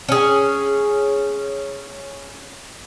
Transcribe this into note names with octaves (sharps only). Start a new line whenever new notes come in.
C#4 G#4